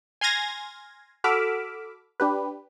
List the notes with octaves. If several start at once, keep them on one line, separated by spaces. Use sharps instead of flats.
G#5 C6 F6 G#6 A#6
F#4 A4 B5 D6 E6 F6
D4 G4 B4